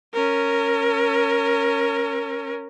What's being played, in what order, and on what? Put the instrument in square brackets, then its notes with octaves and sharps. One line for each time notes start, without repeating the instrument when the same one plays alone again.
[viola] C#4 A#4